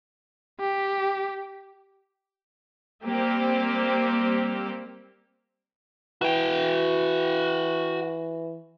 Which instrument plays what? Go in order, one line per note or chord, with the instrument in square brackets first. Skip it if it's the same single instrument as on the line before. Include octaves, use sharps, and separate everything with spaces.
[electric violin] G4
[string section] G3 A#3 C4 G4
[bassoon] E3 [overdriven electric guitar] F#4 G5